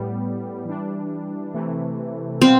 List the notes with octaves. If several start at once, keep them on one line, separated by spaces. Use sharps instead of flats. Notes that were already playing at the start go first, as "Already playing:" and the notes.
Already playing: A2 G3 B3
E3 G3 D4
C3 E3 A3
B2 G3 B3 C4 F4